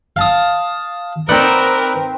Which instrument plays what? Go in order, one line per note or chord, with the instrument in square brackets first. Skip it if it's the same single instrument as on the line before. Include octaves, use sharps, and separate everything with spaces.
[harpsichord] F5 A5 D#6
[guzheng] C4 D#4 F#5 [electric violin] A#4 [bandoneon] B4 [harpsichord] D5